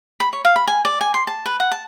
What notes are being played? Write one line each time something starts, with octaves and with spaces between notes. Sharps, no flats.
B5
C#5
F5
B5
G#5
D5
G#5
C6
A5
B4
F#5
A5